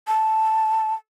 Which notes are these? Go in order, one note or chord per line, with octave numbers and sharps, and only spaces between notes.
A5